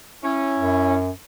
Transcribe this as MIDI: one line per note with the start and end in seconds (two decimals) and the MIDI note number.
0.23 0.95 61
0.23 0.95 64
0.58 1.10 42